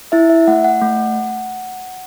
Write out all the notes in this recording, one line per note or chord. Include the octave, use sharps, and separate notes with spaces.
E4 E5
E5
A3 F#5
F#5
A3